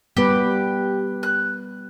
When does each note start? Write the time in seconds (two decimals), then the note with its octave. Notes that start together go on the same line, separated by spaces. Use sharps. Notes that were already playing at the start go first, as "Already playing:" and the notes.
0.17 G3 B3 G4 B4
1.23 F#6